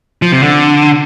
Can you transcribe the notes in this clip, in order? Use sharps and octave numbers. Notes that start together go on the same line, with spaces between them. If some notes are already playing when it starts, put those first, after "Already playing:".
F3
C3
D3